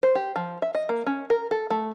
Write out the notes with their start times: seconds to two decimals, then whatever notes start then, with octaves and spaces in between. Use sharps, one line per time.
0.03 C5
0.15 G4
0.36 F3
0.62 E5
0.75 D#5
0.89 A#3
1.06 C#4
1.30 A#4
1.51 A4
1.70 A3